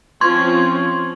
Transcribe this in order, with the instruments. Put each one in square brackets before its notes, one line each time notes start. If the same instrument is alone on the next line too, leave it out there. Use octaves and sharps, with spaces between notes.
[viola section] F3 C4 C#4 [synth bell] C6 C#6 G#6